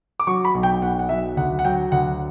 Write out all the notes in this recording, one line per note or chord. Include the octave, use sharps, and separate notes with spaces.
D6
F#3 C#6
B5
B1
G5
B1 F#5
F#5
F#3 E5
D2 F#5
F#5
F#3 G5
D2 F#5